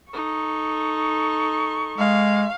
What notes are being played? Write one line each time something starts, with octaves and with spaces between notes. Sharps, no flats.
D#4 A4 C#6
G#3 F5